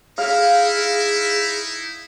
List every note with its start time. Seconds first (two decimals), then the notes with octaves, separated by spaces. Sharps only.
0.18 D#4 E4 G#4 F5